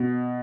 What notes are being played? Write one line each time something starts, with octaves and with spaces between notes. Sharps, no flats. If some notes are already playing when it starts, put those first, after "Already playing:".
Already playing: B2